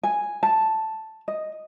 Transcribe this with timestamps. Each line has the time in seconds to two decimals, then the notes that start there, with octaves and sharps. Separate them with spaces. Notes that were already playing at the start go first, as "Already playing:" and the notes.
0.03 G#5
0.43 A5
1.28 D#5